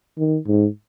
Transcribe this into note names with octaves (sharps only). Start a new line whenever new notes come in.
D#3
G#2